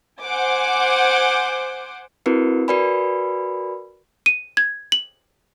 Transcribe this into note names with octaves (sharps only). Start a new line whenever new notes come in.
C5 F#5 G#5 D6
C4 E4 F#4 A#4 B4
F#4 A#4 B4 D5 G#5 B5
D#7
G#6
F#7